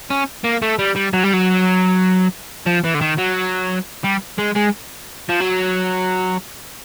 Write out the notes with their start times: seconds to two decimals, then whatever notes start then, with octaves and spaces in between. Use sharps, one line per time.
0.10 C#4
0.44 A#3
0.62 A3
0.79 G3
0.96 G3
1.13 F#3
1.24 G3
1.33 F#3
2.67 F3
2.84 E3
2.94 D3
3.01 D#3
3.18 F#3
4.04 G3
4.39 G#3
4.56 G#3
5.29 F3
5.41 F#3